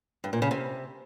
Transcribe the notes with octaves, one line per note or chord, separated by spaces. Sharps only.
G2
A#2
C#3
C3